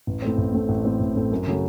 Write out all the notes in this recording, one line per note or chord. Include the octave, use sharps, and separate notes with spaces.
A1
A2 A3 C4
A1
A2 A3 C4
A1
A2 A3 C4
A1
A2 A3 C4
F#2
C#3 F#3 A3